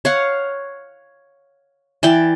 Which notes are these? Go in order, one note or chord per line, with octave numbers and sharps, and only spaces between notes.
C#5 F5 F#5
E3 D5 G5